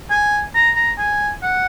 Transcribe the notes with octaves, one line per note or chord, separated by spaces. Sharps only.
G#5
A#5
A#5
G#5
F#5